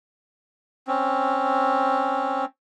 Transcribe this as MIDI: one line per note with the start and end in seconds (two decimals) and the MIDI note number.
0.87 2.45 60
0.87 2.45 61